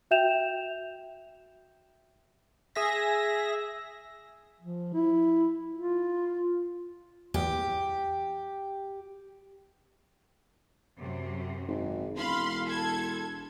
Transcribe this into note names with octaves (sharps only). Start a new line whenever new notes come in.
F#4 E5 G5 G6 E7 F7
G#4 E5 A#6
F3
E4
F4
E2 G4
F#2 C3
G#1
E1 F5 B5 C6
A4 G#6